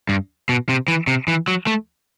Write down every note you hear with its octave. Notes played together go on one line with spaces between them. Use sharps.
G2
B2
C3
E3
C3
E3
F#3
A3